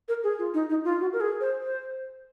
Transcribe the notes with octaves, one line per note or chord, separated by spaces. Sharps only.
A#4
G#4
F4
D#4
D#4
F4
F#4
A#4
G#4
C5
C5